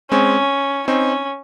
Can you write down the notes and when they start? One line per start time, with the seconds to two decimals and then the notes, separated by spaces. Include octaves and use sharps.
0.11 G#3 C4 C#4
0.88 C4 C#4 D#4